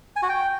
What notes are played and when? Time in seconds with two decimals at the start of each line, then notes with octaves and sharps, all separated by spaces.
0.16 G#5
0.23 F#4
0.29 G5